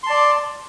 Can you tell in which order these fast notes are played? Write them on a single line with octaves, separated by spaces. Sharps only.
C6 A5 D5